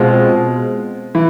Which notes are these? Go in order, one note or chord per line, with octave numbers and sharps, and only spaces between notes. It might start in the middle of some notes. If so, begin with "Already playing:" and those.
Already playing: B2 G#3 C4 F4
E3